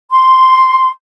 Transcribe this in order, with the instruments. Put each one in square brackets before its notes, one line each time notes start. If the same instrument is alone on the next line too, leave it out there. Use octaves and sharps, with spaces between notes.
[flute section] C6